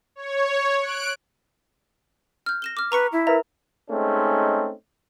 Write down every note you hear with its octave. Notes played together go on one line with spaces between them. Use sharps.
C#5
F#6 D7
F6 G6
A#6 E7 G7
D6 F6
B4 A#5 C#6 C#7
E4
A#4 B4 E5 A#5
G#3 A3 C4 C#4 D#4